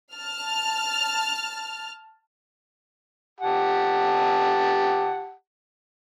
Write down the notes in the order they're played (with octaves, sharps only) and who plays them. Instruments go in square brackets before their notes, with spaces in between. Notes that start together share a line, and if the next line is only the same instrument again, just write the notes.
[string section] A5 F6
[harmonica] G4 F#5 A5